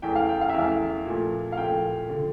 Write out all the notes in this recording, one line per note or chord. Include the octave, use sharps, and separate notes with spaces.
E2 E3 A3 G5
F5
G5
F5
E5
E2 E3 A3 F5
A#2 F3 A3
F5
A#2 F3 A3 G5
D3 F3